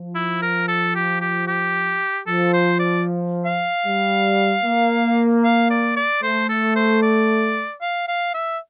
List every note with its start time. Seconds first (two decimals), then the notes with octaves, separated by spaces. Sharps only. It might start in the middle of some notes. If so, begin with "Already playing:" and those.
Already playing: F3
0.15 E4
0.42 A#4
0.68 A4
0.95 G4
1.21 G4
1.47 G4
2.27 F3 A4
2.53 C5
2.79 D5
3.45 F5
3.86 G3
4.64 A#3
5.44 F5
5.70 D5
5.97 D5
6.23 A3 C5
6.49 A4
6.76 C5
7.02 D5
7.81 F5
8.08 F5
8.34 E5